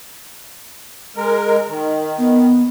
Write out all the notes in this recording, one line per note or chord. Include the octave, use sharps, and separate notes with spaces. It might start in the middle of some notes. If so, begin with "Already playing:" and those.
G#3 A#4
D#3
B3